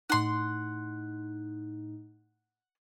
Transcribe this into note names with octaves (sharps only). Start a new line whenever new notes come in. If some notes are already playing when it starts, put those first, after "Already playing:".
A2 D#4 F#5 C6